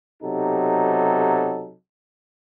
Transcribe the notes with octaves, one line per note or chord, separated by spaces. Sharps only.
B1 C3 F#3 D#4 G4 A4